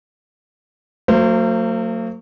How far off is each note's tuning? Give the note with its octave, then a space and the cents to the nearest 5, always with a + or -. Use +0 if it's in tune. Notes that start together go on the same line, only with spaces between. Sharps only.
F#3 -15 A#3 -45 C5 +0